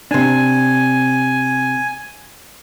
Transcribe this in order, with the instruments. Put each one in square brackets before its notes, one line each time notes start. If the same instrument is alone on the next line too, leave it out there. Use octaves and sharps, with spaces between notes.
[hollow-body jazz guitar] C3 D4 [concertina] G#5